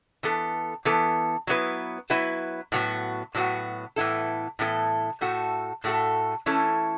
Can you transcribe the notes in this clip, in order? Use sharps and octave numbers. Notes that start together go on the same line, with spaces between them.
E3 B3 A4
E3 B3 A4
F#3 B3 E4 B4
F#3 B3 E4 B4
A2 F#3 B3 F#4
A2 F#3 B3 F#4
A2 E3 B3 E4 A4
A2 E3 B3 E4 A4
A2 A3 F#4 A4
A2 A3 F#4 A4
E3 A3 C#4 E4 A4